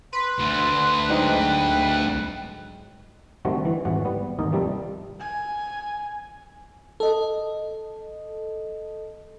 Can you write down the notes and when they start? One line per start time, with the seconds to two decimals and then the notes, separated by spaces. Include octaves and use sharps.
0.13 B4 C6
0.38 D2 D3
1.09 G#2 F#3 G#3 G5
3.45 D3 D#3 G3 A3 C4 F#4
3.65 E3
3.85 G#1 G#2 E3 F#4 C#5 F#5
4.05 G3 B3
4.39 G#1 D#2 D#4 A#4 D#5
4.52 C3 F3 G3 A4 A#4
5.20 G#5
7.00 A4 D#5